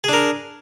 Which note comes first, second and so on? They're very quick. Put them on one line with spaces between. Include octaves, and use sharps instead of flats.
G#4 D4 A#4